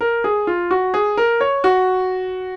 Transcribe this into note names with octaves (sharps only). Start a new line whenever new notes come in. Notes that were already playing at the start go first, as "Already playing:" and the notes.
A#4
G#4
F4
F#4
G#4
A#4
C#5
F#4